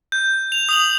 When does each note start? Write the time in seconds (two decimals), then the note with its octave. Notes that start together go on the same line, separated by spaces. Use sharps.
0.12 G6
0.52 F7
0.69 D#6 F7 F#7